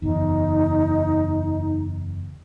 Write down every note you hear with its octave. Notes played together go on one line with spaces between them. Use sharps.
F#1 E2 D#4